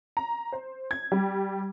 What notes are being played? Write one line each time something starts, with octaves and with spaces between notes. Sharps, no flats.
A#5
C5
G#6
G3